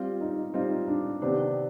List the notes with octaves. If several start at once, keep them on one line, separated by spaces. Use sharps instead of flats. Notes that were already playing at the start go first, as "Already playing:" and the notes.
Already playing: G3 C4 F4
D#4
G3 C4 D#4 F4
D4
C3 D#3 B3 C4 D4 G4